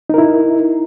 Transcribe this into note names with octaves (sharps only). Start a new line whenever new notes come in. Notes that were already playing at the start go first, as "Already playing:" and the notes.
D#4 E4 A#4